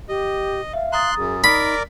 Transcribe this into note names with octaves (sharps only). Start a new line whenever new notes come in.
G4 D#5
E5 F5
A#5 C6 D#6 F#6 A6
F#2 G#4
D#4 A#4 D5 B5